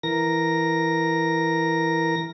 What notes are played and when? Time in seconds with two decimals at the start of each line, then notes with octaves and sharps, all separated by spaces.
0.03 E3 A#4 A#6